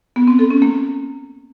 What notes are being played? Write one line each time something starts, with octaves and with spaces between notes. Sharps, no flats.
B3
C4
A4
C#4
A#3